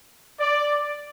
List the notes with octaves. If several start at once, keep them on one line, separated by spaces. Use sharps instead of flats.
D5